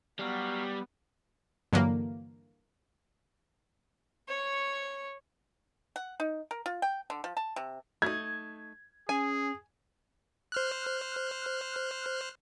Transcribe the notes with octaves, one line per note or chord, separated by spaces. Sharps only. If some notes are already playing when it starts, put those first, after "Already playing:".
F#3 G3 B3 F#4 F5
G2 D3 E3 F#3 A#3
C#5 C#6
F#5
D#4
A#4
F4
G5
D3
F3
A5
C3
A3 D#4 G#6
C#4 G#4 G#5
C5 F6 F#6